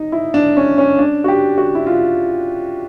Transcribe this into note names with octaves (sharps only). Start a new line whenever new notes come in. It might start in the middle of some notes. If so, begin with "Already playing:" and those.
Already playing: D#4
E4
D4
C#4
C#4
D4
F#4
G4
F#4
E4
F4